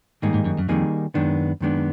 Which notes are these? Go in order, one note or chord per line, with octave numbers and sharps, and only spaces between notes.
G#2 D#3 G3 A#3 D#4 G#4
G#2
F#2
F#2
F2 D#3 G3 A#3 D#4 G#4
F#2 D#3 G#3 B3 D4
F#2 D#3 G#3 B3 D4